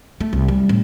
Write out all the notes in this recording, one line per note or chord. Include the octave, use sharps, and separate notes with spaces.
A3
C2
G3
A1